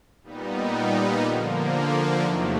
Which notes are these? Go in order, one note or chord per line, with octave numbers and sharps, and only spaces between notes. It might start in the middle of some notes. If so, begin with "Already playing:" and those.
A#2 G3 B3 D#4
D3 F3 A#3
E2 C3 D#3 F#3 A3